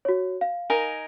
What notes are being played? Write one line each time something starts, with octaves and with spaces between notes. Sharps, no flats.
F#4 C#5
F5
D#4 A#4 G#5